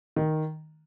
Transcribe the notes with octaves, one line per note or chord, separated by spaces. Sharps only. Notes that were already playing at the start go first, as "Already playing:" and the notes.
D#3